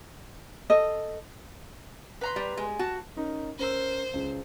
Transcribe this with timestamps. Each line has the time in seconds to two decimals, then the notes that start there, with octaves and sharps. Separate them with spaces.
0.70 A4 D#5
2.21 B4 A#5 C6
2.36 G3
2.57 G#3
2.79 F#4 A5
3.17 C#4 D#4 A#4
3.59 C#4 A#4 C5 E6
4.14 C#2 C#3